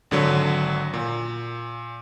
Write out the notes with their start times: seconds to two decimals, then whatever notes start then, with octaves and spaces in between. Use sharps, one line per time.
0.11 G#1 D3 F#3
0.94 A#2